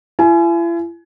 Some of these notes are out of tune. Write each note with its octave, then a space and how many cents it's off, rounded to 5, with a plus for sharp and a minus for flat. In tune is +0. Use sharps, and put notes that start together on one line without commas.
E4 +45 G#5 +25